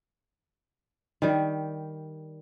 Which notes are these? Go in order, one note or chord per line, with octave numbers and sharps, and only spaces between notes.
D#3 G3